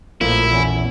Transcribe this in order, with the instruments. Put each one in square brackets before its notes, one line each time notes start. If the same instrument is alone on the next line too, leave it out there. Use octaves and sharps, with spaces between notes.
[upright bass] A#1 [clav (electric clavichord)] A2 F3 A#3 [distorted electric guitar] E4
[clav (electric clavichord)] E2 C#4